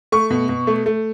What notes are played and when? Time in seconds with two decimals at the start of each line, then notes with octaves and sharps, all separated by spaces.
0.12 A3 C#6
0.30 B2
0.49 B2
0.67 A3
0.86 A3